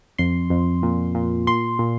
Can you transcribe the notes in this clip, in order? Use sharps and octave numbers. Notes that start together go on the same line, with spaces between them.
F2 C6
F2
A#2
A#2
A#2 C6
A#2